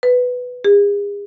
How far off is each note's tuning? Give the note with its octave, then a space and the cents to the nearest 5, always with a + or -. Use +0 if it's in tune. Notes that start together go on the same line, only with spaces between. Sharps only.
B4 +5
G#4 -40